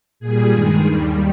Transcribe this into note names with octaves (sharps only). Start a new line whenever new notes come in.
A#2 G#4
G3
G2 D#3 G#3
D#2 D#3 G3